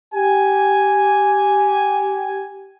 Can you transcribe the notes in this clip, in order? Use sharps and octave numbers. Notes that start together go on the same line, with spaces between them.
G4 G#5